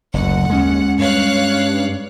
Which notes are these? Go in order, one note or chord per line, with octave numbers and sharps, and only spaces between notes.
F#1 D2 F#5
D#2 G#3 C#4
G2 C#5 F5 F#6